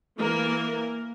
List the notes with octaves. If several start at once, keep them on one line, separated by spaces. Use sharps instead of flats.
E3 A#3 A#4